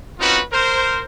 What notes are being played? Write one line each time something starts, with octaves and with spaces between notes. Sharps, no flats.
C4 C#4 D#4 F4 F#4 B4
A#4 C5